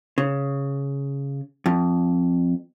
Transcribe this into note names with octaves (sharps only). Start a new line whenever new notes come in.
C#3
F2